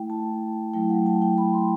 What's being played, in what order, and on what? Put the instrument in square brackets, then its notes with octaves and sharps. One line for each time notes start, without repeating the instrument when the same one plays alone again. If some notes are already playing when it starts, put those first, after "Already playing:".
Already playing: [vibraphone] A3 E4 G5
A5
F#3 A3 E4 G5
F#5
A5
G5
B5
C6